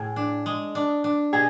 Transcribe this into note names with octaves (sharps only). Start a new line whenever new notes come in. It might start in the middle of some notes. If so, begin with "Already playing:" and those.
Already playing: A2 G#4
D4
G#3
D4
D4
B2 G#4